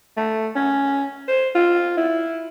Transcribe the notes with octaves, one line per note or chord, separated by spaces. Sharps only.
A3
C#4
C5
F4
E4